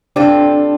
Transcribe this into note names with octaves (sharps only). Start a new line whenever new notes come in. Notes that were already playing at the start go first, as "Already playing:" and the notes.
G3 C4 D4 F4 A4